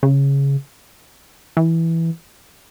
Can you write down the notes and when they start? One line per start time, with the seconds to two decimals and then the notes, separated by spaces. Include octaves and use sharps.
0.03 C#3
1.57 E3